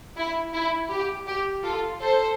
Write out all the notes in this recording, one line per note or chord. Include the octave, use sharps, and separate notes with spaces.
E4
E4
G4
G4
F4 A4
A4 C5